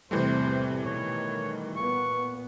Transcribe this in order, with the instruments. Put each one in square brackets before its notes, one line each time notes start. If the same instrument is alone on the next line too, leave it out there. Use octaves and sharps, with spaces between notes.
[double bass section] E2 A2 C3 [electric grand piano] E3 G3 A3 [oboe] C5
[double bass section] B2 D#3 [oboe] C#5
[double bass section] A#2 B3 [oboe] C#6